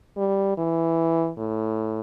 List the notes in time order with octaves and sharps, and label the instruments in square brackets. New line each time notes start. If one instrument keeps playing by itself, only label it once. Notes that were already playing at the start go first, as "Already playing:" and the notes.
[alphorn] G3
E3
A2